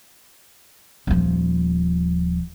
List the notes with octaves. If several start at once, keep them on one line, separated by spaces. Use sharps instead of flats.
D#1 F3